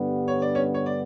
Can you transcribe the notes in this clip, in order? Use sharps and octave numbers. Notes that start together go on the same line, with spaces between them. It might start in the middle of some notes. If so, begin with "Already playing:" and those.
Already playing: G2 D3 G3 B3
C#5
D5
C#4 C#5
C#5
D5